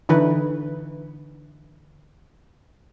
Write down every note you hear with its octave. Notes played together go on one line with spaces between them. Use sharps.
D3 E3 D#4 B4